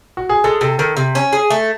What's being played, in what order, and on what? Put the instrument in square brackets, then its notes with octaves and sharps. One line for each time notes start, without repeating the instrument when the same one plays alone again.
[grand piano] F#4
G#4
[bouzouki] G#3 [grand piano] A4
[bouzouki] C3 [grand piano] A4
[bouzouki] D#3 [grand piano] A4
[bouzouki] C3
C#4
G#4
A3